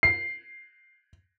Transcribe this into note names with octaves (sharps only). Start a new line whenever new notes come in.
C7